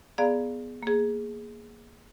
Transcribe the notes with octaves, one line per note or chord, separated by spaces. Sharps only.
B3 G#4 D5 F5 A#5
A#3 G#4